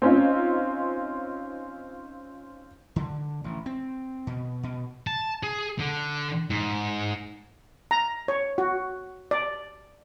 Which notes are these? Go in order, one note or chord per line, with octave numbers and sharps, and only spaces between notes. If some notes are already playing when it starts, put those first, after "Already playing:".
C4 C#4 D#4 F4
D3
A1
C4
B2
B2
A5
G#4
D3
G#2
A#5
C#5
F#4
D5